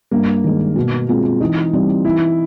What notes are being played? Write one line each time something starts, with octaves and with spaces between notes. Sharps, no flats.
G2 A#3
D#3 G#3
B2
G#3 C4 F4
E3 D#4
G3 C4
E3 E4